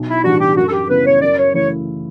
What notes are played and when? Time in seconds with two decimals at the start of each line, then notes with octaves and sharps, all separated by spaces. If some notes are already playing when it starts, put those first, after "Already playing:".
Already playing: B1
0.08 E4
0.24 A2 E3 G3 D4 F#4
0.40 G4
0.56 F#2 F#4
0.67 A4
0.73 G4
0.89 C#3 G3 B3 E4 B4
1.06 C#5
1.21 F#2 D5
1.38 C#5
1.54 C#3 E3 A3 E4 C#5